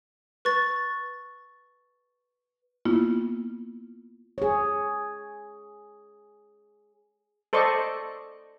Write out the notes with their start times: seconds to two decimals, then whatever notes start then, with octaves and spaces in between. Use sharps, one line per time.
0.45 B4 C#6 A6
2.85 A#3 B3 E4 F4
4.38 G#4 C#5
7.53 A4 C5 D5 D#5 C#6